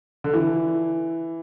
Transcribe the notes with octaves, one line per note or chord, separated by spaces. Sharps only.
D3
E3